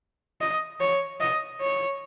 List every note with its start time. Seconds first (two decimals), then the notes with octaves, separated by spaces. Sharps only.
0.41 D#5
0.80 C#5
1.21 D#5
1.61 C#5